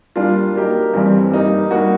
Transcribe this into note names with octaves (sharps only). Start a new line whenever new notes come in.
G3 A#3 D4 F4
F#3 A#3 D#4 G4 A#4
G2 E3 G3 C4
G3 A#3 D#4 G4
G3 A#3 D#4 F#4